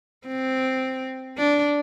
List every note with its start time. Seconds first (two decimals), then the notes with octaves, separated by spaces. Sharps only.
0.26 C4
1.37 D4